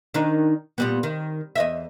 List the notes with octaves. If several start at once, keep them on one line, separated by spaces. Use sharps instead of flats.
D#3 D4 D#4
A#2 G3 B3
D#3
E2 D#5 E5